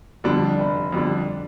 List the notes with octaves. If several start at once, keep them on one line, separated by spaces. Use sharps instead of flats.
F2 D3 G3 D4
F1
F2 D3 G3 D4